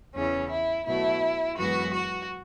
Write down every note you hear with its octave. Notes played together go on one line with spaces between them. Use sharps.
E2 C#3 E3 C#4
E4
B2 F#3 A3 E4
F#2 E3 G#3 B3 F#4
F#4